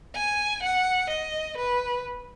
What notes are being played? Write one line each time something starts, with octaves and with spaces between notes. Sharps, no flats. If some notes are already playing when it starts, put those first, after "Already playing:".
G#5
F#5
D#5
B4